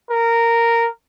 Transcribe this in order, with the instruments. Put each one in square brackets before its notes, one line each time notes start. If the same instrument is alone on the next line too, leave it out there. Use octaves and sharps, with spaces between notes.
[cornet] A#4